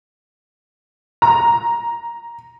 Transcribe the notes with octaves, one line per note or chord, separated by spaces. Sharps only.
A#5